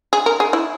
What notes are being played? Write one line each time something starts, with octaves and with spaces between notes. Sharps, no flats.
G#4
A#4
G#4
E4